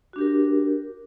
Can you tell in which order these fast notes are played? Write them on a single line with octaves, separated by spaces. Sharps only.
F#4 D4 G4 A#4